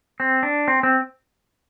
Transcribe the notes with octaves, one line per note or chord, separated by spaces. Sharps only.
C4
D4
C4
C4